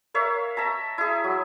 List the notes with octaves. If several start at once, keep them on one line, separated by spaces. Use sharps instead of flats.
A#4 C#5 E5 F5
E5 A5 A#5
E4 G#4
F#3